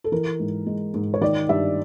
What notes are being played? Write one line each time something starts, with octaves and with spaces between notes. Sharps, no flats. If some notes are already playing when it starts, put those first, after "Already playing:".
A4
E3 A#4
G#2
G#3
G#2
C#5
D#3 D5
G2 E5